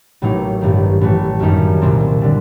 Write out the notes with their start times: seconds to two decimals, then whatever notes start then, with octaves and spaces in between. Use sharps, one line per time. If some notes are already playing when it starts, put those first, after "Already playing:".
0.22 A1 A2 F#3 A#3 D#4
0.61 A1 G2 D#3
1.01 A1 A2 E3 A3
1.40 F#2 D#3 G3 A#3 D#4
1.81 C2 A#2 G3 C4
2.21 D3 G3